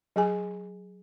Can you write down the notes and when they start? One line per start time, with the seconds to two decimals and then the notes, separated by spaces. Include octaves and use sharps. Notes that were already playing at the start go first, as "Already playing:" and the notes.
0.16 F#3 G#4 G#5